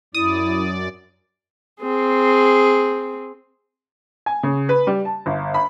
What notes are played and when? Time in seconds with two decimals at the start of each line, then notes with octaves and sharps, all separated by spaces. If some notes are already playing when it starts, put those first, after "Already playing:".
0.14 F#2 E4 D5 D#6
1.81 C4 G#4
4.26 G#5
4.43 C#3
4.69 B4
4.87 G3
5.05 A5
5.26 G1
5.54 B5